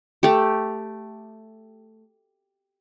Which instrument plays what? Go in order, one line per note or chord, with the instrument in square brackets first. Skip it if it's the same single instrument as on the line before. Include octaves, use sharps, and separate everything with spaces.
[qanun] A3 G4